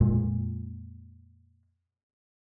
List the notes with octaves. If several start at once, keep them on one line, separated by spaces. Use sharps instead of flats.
F2 A#2 G#3